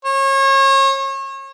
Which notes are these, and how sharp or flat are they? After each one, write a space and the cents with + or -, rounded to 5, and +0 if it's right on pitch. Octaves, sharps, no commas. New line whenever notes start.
C#5 -35